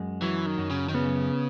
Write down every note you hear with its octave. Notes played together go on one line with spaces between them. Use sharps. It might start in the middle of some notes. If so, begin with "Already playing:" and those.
Already playing: F#2 G#3
E3 F#3
D#3
F#2
C#3
D#3
C#3 B3